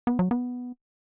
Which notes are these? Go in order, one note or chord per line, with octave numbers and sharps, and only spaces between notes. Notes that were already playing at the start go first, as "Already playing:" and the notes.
B3
F#3
B3